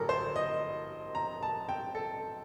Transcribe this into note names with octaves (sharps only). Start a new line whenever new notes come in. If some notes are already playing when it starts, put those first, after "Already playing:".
Already playing: A1 G2 D3 F#3 A4 A#4
C5
D#5
A#5
A5
G5
A4